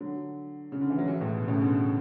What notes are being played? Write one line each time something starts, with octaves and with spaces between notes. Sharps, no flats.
D3 F#3
C#3
D3
E3
F#3
E3 G#3
A2
B2
A2 C#3
B2 D3